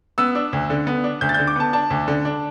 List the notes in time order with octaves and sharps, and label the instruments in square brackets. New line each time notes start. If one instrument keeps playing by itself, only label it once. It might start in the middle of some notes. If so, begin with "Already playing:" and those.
[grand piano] B3 E6
D4
D2
D3
B3
D4
D2 G6
A6
D3 G6
D6
B3 A5
D4 A5
D2
D3
D4